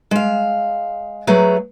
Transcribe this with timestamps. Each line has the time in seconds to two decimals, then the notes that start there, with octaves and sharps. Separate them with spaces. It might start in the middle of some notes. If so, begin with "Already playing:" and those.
0.11 G#3 F5
1.27 F#3 A3 G#4 B4 A#5